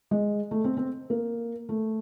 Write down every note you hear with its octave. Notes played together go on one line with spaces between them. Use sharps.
G#3
A3
C4
C4
A#3
A3